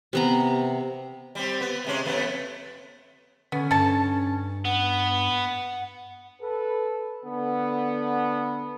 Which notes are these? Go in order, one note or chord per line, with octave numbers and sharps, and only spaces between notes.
C3 B3 A#5
G3 C4
B3
C3 G#3 C#4
F2 A3 B3
D3 B3 C#4
G2 A4 A5
B3 F#5
A4 B4
D3 B3